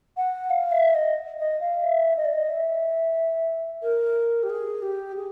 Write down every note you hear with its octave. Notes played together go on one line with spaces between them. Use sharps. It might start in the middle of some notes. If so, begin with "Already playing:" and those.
F#5
F5
E5
D#5
D#5
F5
E5
D#5
D5
D#5
E5
A#4
G4
G#4
G4
G#4